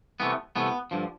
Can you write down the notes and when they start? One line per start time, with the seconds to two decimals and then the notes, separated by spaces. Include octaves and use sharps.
0.20 C2 C3 E3 A3 B3
0.56 C2 C3 E3 A3 B3
0.91 G2 D3 F3